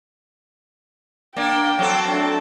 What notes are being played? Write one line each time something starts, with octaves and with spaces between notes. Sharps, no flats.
A#3 D4 G5
F#3 C4 A4
A3 D4